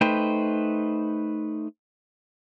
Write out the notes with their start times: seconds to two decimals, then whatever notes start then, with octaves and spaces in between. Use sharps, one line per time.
0.01 A3 D#4 B4 C5 G5